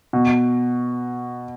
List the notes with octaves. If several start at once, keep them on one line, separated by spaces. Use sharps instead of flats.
B2